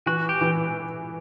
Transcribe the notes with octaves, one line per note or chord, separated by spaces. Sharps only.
E3 F#4
G4
E3